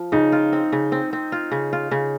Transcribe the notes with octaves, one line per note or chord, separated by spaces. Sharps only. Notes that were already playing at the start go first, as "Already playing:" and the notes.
Already playing: F3
C#3 D#4
F4
C4
C#3
C4
C4
F4
C#3
F4
C#3